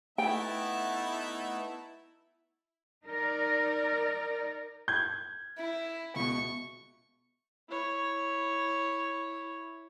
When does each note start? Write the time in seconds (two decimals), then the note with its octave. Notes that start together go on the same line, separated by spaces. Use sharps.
0.18 A3 B3 D#4 E4 E5 G5 A5
3.05 D#4 A#4 D5
4.88 G6 G#6
5.58 E4
6.16 C#2 B2 C#6
7.69 E4 C#5